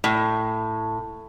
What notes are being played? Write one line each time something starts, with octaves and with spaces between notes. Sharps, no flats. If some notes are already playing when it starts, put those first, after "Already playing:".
A2